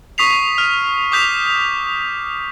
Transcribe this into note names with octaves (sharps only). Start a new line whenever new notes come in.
C#6 D#6 B6 C7 F7
F6
D6 D#6 G6 B6 F7